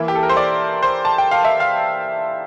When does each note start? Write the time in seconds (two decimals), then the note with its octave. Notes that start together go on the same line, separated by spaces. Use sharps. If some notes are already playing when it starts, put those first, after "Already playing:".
Already playing: E3 A#3 E4 E5
0.08 G4
0.15 A4
0.23 A#4
0.29 C5
0.37 D5
0.83 C5
1.05 A5
1.18 G5
1.31 F5
1.45 E5
1.60 F5